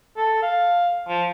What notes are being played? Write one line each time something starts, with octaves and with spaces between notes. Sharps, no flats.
A4
F5
F3